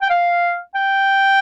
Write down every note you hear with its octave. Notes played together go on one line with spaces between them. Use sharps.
G5
F5
G5